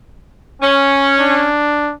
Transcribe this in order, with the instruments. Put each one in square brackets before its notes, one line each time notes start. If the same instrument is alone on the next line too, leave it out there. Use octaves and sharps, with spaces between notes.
[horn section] C#4
[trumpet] D4